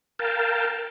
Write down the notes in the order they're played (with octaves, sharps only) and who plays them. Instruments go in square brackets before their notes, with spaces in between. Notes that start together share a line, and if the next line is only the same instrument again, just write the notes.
[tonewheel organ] A#4 F5 G5 A5